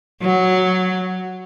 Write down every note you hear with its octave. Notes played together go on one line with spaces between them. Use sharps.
F#3